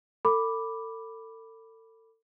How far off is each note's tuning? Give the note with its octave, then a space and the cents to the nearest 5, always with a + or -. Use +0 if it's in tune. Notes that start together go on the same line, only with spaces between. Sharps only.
A4 +35 B5 +0 D6 +0